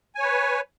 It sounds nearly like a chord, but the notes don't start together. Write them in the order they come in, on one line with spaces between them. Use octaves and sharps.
G#5 C#5 B4